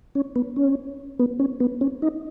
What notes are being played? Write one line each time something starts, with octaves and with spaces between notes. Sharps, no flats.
C#4
B3
C#4
B3
C#4
B3
C#4
D#4